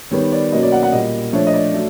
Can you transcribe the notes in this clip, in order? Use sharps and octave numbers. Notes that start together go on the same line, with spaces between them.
D#3 G3 B3 C#5
D5
B2 F#3 A#3 C#4 D#5
D5
F#5
F#5
A#2 G3 A#3 D#5
F3 A3 D4 C#5
D#5
D5
F#3 A3